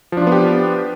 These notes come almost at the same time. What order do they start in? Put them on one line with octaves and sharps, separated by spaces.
F3 D4 F4 B3 G4